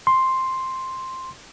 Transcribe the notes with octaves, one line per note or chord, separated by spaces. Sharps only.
C6